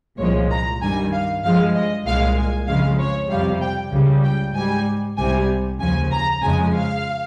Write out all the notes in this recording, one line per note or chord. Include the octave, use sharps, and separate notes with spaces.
C2 A#2 F3 G#3 C#5
A#5
G2 D#3 G3 G#5
F5
G2 F3 G#3 F5
D#5
C2 A#2 G#3 F5
G#5
F2 C#3 F3 G#3 F5
C#5
F2 C3 G3 F5
G5
C#2 C#3 G3
G5
G#2 G3 G#5
C2 C3 G3 G#5
D#2 C#3 F3 G#5
A#5
F2 C#3 F3 G#3 G#5
F5